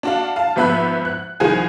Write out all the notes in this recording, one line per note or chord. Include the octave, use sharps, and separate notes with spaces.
D4 F#4 F5
F5 A5
G#1 F3 B3 E5 B5 F#6
F#6
C2 D#3 F3 G#4 G#5